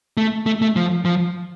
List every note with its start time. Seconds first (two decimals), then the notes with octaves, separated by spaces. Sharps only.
0.17 A3
0.46 A3
0.62 A3
0.76 F3
1.05 F3